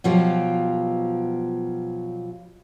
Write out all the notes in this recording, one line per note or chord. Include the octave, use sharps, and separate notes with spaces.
B2 F3 F#3 F4 G4